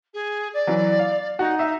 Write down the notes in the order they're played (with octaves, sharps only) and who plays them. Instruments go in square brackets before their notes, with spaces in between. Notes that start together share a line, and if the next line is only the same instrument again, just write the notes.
[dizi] G#4
D5
[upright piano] E3 F#3
F5
[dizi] D#4 [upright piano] F#4
[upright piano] E5